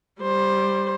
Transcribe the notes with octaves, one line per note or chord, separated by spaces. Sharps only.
G3 C5